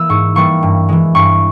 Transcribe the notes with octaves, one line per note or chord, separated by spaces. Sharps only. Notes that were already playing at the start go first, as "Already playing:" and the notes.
Already playing: E3 A#3 E6
G#2 C#6
E3 G3 A#3 C#6
G2
E3 G#3
G2 C#6